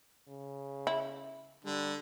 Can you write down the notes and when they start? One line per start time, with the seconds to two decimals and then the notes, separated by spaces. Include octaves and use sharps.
0.29 C#3
0.87 E4
1.65 D3 G3